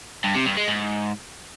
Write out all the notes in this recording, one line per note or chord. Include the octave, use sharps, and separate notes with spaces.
G2
C3
G2
G#3
G#2